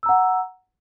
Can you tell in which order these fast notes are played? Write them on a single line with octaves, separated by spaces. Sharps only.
E6 A#5 F#5